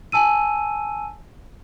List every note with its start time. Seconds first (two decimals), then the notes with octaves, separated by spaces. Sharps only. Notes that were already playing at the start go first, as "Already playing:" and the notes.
0.12 G#5 A5 E6 D#7